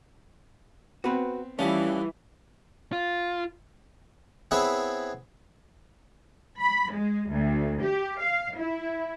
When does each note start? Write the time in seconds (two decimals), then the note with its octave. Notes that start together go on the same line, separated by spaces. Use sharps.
1.04 B3 C4 F#4 B4
1.59 E3 F3 G3 A3 C#4
2.93 F4
4.51 B3 C4 E4 G#4 B4 C#5
6.60 B5
6.93 G#3
7.30 D2
7.82 G4
8.21 F5
8.58 E4